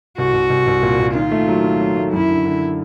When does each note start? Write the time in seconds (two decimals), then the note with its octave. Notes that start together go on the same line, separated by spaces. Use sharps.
0.18 C2 F#4
0.34 C2
0.50 C2
0.67 C2
0.83 A#2
1.00 A#2
1.15 D#3 F4
1.31 A3
1.48 F#3
1.64 D#3
1.81 F#3
1.97 A3
2.13 F#2 E4
2.30 D3
2.45 D3